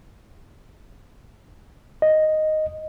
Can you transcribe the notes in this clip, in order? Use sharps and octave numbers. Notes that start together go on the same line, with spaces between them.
D#5